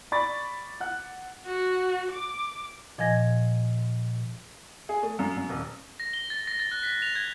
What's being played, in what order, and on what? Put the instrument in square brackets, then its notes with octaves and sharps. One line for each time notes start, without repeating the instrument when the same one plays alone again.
[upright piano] D5 B5 C#6 D6 A6
F#5 F#6
[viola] F#4
D6
[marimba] A#2 F3 D#5 G#5 G#6 A#6
[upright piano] G#4
A3
F#2
F#2
D#1
[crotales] A#6
G7
A6
A#6
A6
F#6
B6
F7
G#6